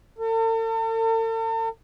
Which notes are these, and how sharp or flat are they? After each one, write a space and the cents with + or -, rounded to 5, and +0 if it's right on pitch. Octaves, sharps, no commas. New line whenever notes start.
A4 +45